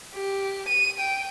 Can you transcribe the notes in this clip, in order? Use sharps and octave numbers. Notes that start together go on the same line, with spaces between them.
G4
D#7
G5